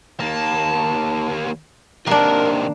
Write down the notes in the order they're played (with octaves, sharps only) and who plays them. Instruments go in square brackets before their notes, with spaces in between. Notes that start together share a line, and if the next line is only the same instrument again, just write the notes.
[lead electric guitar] D#2 A#3 [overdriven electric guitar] A5
[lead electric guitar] C3 D#3 [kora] A#3 D4 [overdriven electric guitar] A#4